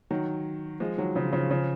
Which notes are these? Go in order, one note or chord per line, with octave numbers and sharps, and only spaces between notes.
D#3 F#3
F3 G#3
D#3 F#3
C#3 F3
C#3 F3
C#3 F3